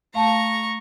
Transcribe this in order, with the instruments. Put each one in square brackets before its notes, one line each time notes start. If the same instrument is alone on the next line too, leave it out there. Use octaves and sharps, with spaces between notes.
[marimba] A3 F5 A5 [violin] A#5 C#6